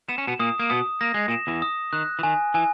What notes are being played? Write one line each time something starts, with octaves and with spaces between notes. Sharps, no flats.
B3 E7
C#4
B2 B3
A#2 A#3 D#6
A#3
B2 B3 D#6
A#3 A#6
G#3
A#2 A#3 E7
E2 E3
D#6
D#3 F#6
E3
D#3 G#5
E3 G#5